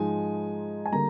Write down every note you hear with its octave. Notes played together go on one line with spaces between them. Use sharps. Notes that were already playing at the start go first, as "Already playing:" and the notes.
Already playing: G#2 F3 G#3 D#4 G#5
G#5
D3 G3 A#3 A#5